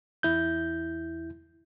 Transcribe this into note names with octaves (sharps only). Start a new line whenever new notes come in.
E2 E4 G6